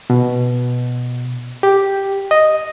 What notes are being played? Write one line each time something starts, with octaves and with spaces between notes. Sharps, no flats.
B2
G4
D#5